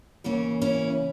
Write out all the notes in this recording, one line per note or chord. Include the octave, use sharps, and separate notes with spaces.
C#3 E3 A#3 C#4
C#4 E4